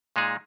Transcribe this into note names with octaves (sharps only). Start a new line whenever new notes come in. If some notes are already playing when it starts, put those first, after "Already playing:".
A#2 G#3 D#4 G#4